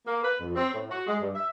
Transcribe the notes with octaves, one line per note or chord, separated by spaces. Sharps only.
A#3
B4
F2
C4
A2
F#4
G#3
G2
E5